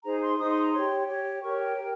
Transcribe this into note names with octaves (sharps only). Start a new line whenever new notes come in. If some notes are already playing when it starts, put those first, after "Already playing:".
D#4 G#4 C5 A#5
C6
D#4 G#4 C5 D#6
C6
A#5
G4 C#5 C6
G4 C#5
G4 A#4 C#5 C#6
G5
G4 A#4